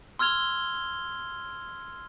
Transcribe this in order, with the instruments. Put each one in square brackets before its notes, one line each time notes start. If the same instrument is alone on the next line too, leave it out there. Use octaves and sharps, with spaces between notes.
[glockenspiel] C6 E6 F6 G#6 F7 G7